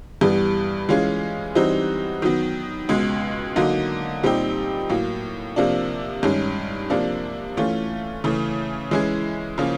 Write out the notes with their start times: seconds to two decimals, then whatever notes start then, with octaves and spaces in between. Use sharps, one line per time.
0.21 G2 E3 G3 B3
0.89 E3 G#3 C#4 F4 G#4
1.55 E3 G3 C4 D#4 F#4
2.22 D#3 F#3 B3
2.89 C#2 B2 G#3
3.56 D3 F#3 A#3 D#4
4.23 A#2 G3 C4 D#4 G4
4.89 A2 F#3 A#3
5.56 C3 F3 A#3 D4
6.23 G2 D#3 G#3 C#4
6.90 C3 F3 A#3 D4
7.57 E3 A3 C#4 F4
8.24 C#3 E3 A3
8.91 E3 G#3 C#4 E4 G#4
9.58 C#3 F3 A#3 C#4